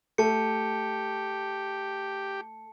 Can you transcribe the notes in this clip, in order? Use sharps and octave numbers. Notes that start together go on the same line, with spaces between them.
A3 G4 A5 C#7